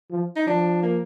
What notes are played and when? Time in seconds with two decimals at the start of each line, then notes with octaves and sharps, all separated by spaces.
0.11 F3
0.36 D#4
0.47 F3 D4
0.83 A#3